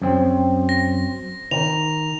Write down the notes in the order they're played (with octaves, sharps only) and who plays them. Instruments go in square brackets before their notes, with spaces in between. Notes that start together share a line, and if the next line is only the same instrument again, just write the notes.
[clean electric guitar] F#2 C4
[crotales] A#6
[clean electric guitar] D#3 [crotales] F7